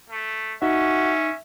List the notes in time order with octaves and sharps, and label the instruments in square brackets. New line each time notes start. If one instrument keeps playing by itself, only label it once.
[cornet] A3
[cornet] C#4 [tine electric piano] D#4 [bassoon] F#4 [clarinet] E5